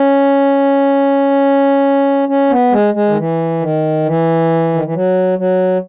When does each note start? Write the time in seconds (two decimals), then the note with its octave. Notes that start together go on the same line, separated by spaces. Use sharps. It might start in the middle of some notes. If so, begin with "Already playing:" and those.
Already playing: C#4
2.29 C#4
2.50 B3
2.72 G#3
2.94 G#3
3.09 D#3
3.17 E3
3.61 D#3
4.06 E3
4.74 D#3
4.84 E3
4.94 F#3
5.38 F#3